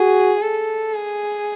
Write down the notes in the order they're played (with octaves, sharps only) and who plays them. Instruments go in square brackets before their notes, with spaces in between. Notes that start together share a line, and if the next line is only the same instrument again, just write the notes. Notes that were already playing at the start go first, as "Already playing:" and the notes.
Already playing: [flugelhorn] F#4 [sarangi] G#4
[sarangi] A4
G#4